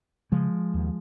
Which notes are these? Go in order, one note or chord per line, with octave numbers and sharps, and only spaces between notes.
C#3 F3 G#3
D#2